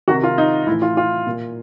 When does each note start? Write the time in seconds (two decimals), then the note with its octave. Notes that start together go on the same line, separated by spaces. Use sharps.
0.08 C3 D#3 F#4
0.23 F4
0.38 D#4
0.67 A2 E4
0.72 E3
0.82 F4
0.97 F4
1.27 A#2